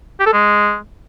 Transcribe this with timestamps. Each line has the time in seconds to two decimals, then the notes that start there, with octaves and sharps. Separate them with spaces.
0.20 G4
0.26 A4
0.33 G#3